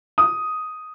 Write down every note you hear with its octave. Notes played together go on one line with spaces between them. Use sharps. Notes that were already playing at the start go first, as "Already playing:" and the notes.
D#6